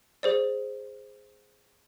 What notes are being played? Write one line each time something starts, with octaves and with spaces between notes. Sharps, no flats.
G#4 C5 D5